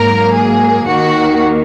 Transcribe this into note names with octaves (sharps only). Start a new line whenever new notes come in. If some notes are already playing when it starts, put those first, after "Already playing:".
Already playing: G#2 F#3 A#3 A#4
G#4
D#2 D#3 A#3 F#4